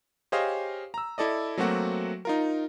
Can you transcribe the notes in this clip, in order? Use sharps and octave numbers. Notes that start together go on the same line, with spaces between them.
G4 G#4 C5 C#5 D#5 F5
A#5 E6
E4 A4 D5 D#5
F#3 A3 A#3 C4 F#4
D#4 F4 A#4